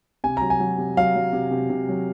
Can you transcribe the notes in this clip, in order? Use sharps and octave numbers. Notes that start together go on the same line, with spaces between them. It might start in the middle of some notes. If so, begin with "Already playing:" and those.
C3 G#5
F#3 A#5
G#5
F#3
C3
F#3 F5
F#3
C3
C3
C3
F#3